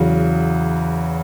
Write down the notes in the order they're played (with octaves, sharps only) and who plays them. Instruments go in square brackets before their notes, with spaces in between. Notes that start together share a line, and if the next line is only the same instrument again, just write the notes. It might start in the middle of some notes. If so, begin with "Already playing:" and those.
Already playing: [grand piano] E2 C#3 F#3